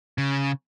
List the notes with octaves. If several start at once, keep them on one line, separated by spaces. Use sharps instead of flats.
C#3